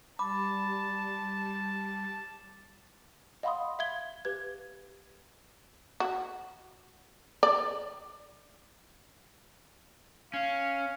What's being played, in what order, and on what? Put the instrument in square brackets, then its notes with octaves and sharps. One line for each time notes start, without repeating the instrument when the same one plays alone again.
[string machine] G3 [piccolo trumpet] A5 [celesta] B5 [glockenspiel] D6
[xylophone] D#5 F5 F#5 B5 C6 D#6
E5 F5 G#6 G7
G4 B4 G#6
[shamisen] F#4
D5
[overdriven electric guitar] C#4 [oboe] F5